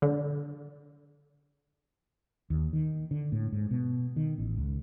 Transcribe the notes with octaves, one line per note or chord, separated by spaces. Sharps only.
D3
D#2
D#3
D3
A2
G#2
B2
D#3
A1
C#2